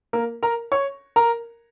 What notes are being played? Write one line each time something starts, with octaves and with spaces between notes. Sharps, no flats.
A#3 A#4
A#4 A#5
C#5 C#6
A#4 A#5